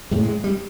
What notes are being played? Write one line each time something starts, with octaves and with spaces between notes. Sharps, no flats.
A2 G#3
G#3
G3